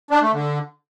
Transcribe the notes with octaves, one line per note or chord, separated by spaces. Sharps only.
D4
A3
D3